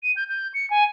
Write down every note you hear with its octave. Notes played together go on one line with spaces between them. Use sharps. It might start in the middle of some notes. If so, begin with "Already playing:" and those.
D#7
G6
G6
C#7
G#5